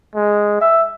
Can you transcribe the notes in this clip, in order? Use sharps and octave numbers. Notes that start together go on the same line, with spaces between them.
G#3
E5